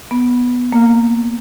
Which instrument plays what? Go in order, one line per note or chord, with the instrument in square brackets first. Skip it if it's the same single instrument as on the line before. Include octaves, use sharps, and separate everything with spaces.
[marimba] B3
A#3